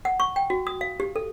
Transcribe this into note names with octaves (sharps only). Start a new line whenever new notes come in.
F#5
C#6
G5
F#4
D#6
F5
G4
A4